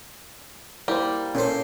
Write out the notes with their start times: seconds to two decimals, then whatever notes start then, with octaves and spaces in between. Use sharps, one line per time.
0.88 G3 A#3 E4 A#4 C5
1.35 A#2 C#4 A4 C5